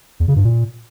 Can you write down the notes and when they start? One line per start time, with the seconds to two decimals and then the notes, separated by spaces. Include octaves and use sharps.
0.20 E2
0.28 C#3
0.36 G2
0.44 A#2